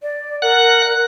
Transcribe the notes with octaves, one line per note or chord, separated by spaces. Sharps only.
D5
A#4 F#5 F#6